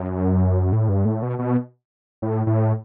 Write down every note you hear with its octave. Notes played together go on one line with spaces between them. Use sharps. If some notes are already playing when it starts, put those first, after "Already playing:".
Already playing: F#2
A2
G2
A2
B2
B2
A2
A2